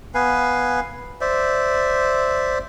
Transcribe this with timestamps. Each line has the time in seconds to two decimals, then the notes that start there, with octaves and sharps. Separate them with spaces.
0.14 B3 B4 F5 G#5
1.21 C5 D5 E5